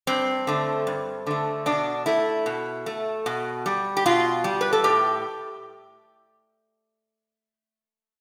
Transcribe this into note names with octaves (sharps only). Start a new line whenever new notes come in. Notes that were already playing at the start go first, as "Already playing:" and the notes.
G2 C4
D3 A3
G2
D3 A3
B2 D4
A3 E4
B2
A3
B2
G3
G4
B2 F4
G3
B4
A4
A2 G4